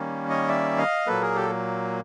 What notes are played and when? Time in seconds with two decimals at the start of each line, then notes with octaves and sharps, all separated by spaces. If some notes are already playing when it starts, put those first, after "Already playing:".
Already playing: D#3 G3 A#3 C#4
0.29 C#5 D#5
0.48 D5 E5
0.77 D#5 F5
1.07 A#2 F#3 A#3 A4 B4
1.21 G#4 A#4
1.36 G4 A4